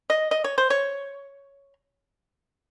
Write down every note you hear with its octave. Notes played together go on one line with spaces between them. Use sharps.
D#5
D#5
C#5
C5
C#5